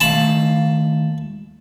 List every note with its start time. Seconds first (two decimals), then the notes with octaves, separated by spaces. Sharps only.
0.01 D#2 A3 F5 A5 B5